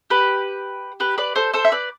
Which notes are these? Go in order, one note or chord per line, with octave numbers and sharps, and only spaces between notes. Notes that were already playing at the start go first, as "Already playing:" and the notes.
G4 B4
G4 B4
B4 D5
A4 C5
A4 C5
E5
B4 D5